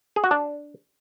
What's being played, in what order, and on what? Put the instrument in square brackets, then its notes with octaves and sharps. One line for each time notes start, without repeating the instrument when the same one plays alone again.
[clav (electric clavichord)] G#4
F#4
D4